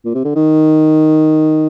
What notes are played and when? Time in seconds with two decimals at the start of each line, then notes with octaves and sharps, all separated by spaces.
0.05 A#2
0.15 C3
0.24 D3
0.35 D#3